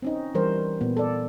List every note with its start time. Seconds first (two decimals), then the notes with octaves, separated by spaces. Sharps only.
0.02 C4 C#4 D#4
0.35 E3 G3 A#4 C5
0.81 A#2 B3
0.97 A4 D5